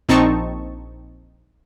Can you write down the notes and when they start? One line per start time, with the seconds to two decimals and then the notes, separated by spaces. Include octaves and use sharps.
0.09 A#1 C4 D#4 A5 C#6